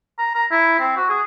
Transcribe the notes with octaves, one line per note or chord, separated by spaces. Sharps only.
A#5
A#5
E4
C4
F#4
G#4